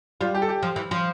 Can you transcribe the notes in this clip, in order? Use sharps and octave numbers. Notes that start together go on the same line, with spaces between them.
G3 F4
G4
A4
G4
F3
E3
F3